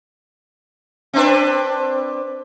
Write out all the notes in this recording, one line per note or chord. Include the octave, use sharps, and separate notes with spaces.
C4 D4 B4